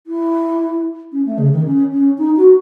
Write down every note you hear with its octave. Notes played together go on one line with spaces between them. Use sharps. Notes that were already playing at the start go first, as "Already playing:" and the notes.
E4
C#4
A3
C#3
D#3
C#4
C#4
D#4
F#4